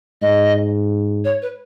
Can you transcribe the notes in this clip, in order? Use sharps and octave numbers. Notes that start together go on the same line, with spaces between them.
G#2 D#5
C#5
B4